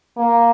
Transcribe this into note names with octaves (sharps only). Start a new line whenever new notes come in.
A#3